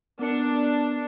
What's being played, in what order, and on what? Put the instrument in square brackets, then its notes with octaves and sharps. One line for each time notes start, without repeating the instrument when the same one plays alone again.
[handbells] B3 A#4 C#7 [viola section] D4